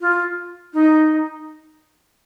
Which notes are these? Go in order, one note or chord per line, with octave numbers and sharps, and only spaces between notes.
F4
D#4